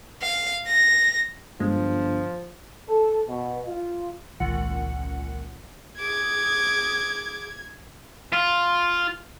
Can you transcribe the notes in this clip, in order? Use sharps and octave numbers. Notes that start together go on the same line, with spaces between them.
F5
A#6
G1 G2 F3 G#3
A4
B2
F4
G#1 C#2 A#2 F#5
G#4 D6 G#6
F4